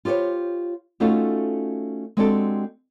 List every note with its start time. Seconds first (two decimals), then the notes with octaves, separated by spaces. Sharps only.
0.05 F4 G4 A4 C5 C#5
1.00 A3 C#4 D#4 F4 F#4 A4
2.17 G#3 C4 D4 F#4 G4 A4